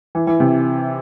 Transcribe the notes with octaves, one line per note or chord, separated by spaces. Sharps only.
E3
E3
C3